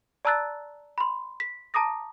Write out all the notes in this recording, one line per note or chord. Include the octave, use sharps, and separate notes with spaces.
D5 A5 A#5 E6 F#6 A6
B5 C6
B6
A5 A#5 D6 D#6 A#6